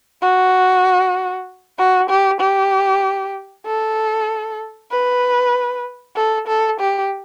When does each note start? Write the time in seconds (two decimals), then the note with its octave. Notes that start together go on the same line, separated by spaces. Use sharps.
0.22 F#4
1.78 F#4
2.09 G4
2.41 G4
3.66 A4
4.91 B4
6.16 A4
6.48 A4
6.80 G4